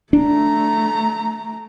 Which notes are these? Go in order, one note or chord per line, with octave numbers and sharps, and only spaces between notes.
A3 D4 A#5